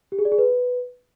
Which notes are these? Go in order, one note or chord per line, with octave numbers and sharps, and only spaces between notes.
G4
G#4
D5
G#4
B4